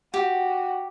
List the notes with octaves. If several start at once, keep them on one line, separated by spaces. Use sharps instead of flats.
F#4 G4